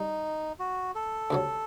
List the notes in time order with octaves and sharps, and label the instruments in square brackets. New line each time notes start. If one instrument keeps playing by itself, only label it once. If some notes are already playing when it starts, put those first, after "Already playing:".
Already playing: [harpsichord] G3 [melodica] D#4
[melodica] F#4
A4
[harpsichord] D2 C3 F#3